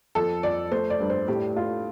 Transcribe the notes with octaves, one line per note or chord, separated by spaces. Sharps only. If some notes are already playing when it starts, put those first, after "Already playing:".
F2 A4
F2 D5
A3 C5
D5
G2
C5
A2 G4
A3 F4